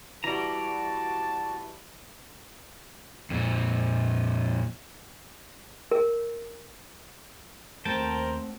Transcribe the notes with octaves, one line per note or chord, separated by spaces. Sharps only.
E3 G3 F#4 D5 A5 A#5
F2 A#2
A#4
D#2 A3 C4 F#4 A#4 C5 G5 A5